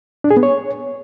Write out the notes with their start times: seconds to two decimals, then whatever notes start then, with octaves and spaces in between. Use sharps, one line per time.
0.24 D4
0.31 G#4
0.37 B3
0.43 C#5